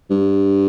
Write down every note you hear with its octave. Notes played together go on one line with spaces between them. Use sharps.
G2